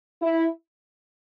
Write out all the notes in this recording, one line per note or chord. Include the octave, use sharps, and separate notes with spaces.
E4